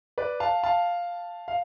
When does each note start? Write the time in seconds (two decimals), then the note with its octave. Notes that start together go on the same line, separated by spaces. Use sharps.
0.18 B4 D5
0.40 F5 A5
0.64 F5 A5
1.48 F5